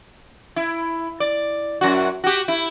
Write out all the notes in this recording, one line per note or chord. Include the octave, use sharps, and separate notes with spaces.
E4
D5
F#2 F#4
F#4 G4
E4